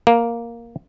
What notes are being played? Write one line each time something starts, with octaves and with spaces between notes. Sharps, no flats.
A#3